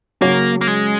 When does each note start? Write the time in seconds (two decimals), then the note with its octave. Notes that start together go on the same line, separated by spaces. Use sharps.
0.21 C#3 F#3 A#3 C#4 F#4 C#5
0.61 A#3
0.68 G#3